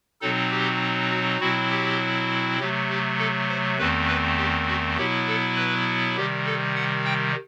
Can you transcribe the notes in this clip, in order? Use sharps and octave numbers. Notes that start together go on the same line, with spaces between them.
B2 F#3 C4 D#4 A4
G4
F#4
B2 F#3 C4 E4 F#4
G4
C3 F#3 A3 G4
G4
A4
C5
E2 D#3 A3 C4 B4
B4
G4
F#4
B2 F#3 B3 E4 G4
A4
B4
C3 D#3 G3 G4
A4
F#5
G5